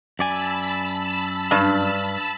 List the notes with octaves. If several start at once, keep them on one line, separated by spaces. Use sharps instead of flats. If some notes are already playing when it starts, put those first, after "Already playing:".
F#2 D5 G#5 A5 B5 E6
G2